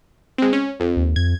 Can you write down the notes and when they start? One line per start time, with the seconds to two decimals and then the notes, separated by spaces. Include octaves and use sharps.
0.38 G#3 C4
0.53 C#4
0.80 F2
0.97 D#2
1.16 F2 G#6